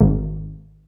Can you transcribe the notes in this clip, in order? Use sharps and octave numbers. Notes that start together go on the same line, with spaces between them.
G#1